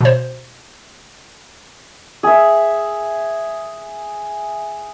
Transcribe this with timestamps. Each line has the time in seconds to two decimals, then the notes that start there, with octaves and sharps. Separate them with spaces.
0.01 B2 C5
2.23 G#4 E5